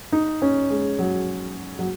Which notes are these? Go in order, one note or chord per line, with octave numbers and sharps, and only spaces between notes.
D#4
C#4
G#3
F#3
F#3